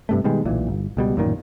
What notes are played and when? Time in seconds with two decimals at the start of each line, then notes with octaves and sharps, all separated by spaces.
0.09 G2 C3 A3
0.24 B2 D#3 G3 G#3
0.45 D1 B1 A#2 E3
0.68 G1
0.97 C#2 B2 G3
1.16 A1 F#2 A#2 D#3